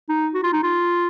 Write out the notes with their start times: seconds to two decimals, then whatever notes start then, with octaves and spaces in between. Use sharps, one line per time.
0.09 D#4
0.34 F#4
0.43 F4
0.53 D#4
0.63 F4